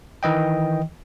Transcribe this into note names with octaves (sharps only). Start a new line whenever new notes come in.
D#3 E3 D#5 G5